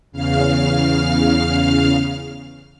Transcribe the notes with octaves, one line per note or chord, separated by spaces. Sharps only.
E2 C#3 F5 F6